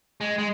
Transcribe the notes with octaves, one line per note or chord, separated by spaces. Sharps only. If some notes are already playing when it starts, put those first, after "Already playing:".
G#3
G#3